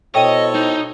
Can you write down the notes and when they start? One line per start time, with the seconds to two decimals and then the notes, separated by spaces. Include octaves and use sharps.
0.15 B2 E4 A4 C5 C#5 D#5 G5
0.55 D#4